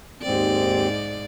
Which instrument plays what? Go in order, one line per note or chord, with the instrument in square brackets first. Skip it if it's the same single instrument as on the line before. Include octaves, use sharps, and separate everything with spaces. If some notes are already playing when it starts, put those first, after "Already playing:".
[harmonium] D#2 C4 [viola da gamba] G#2 D5